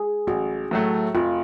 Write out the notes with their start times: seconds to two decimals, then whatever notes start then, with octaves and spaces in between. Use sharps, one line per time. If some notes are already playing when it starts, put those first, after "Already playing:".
Already playing: G#4
0.27 A1 F#4
0.71 A2 F#3 A3
1.15 F1 F4